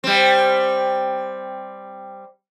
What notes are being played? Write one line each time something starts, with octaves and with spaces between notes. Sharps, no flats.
G3 C4